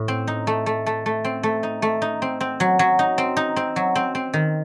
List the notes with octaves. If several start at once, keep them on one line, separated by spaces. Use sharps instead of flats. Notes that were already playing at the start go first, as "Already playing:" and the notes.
Already playing: A2
C4
D#4
A3
A3
A3
A3
C4
A3
D#4
A3
D#4
C4
C4
F#3
F#3
D#4
C4
D#4
C4
F#3
C4
C4
D#3